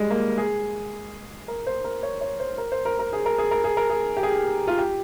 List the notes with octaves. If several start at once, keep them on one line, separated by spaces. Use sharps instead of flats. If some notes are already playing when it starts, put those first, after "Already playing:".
Already playing: G3 G#3
A#3
G#4
A#4
C5
A#4
C#5
C#5
C5
A#4
C5
A#4
A#4
G#4
A#4
G#4
A#4
G#4
A#4
G#4
G4
G#4
F4
G4